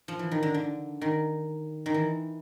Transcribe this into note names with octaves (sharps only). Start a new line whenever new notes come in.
F3
E3
D#3
D3
D3
D#3
D#3
E3